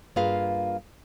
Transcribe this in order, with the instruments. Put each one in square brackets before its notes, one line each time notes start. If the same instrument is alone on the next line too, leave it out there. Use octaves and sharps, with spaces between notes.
[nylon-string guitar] G2 A#3 F4 G#4 B4 F5